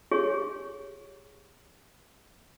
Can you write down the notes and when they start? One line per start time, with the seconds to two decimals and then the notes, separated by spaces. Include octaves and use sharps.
0.11 G4 G#4 C#5 C#6